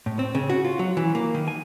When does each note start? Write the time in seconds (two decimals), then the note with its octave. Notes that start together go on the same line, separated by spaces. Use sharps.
0.06 A2
0.19 C4
0.35 C#3
0.49 F#4
0.65 F4
0.79 F#3
0.97 E3
1.15 A#3
1.34 D#3
1.48 G#5